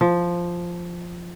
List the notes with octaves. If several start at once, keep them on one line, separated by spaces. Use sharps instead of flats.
F3